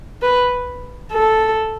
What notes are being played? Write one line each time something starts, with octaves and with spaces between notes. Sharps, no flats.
B4
A4